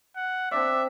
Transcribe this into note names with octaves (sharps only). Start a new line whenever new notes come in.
F#5
C4 D4 D5 E5